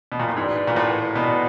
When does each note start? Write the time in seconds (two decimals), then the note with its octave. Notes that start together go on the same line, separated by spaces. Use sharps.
0.12 B2
0.20 A#2
0.28 A2
0.37 G#2 F#4 B4 D5 G5
0.67 A#2
0.76 A2
1.15 B2 F#4 B4 D5 G5